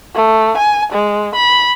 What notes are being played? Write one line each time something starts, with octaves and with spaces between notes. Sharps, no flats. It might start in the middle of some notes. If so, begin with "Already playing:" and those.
A3
G#5
G#3
B5